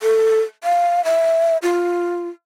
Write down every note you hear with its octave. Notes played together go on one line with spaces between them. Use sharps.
A4
F5
E5
F4